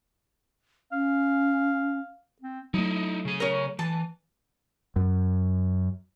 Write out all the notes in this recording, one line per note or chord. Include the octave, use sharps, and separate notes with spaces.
C#4 F5
C4
F#3 A3 D#4 E4
C#3 G#4
C#4 A#4
E3 A5
F#2